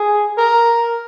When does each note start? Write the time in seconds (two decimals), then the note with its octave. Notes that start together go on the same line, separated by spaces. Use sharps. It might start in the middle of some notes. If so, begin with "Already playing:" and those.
Already playing: G#4
0.38 A#4